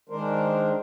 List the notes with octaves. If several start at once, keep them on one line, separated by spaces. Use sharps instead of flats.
D#3 G#3 D4 A#4 C5